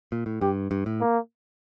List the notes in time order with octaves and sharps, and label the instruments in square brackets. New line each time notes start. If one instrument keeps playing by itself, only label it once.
[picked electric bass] A#2
A2
[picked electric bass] G2 [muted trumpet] G4
[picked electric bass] G2
A2
[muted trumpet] A#3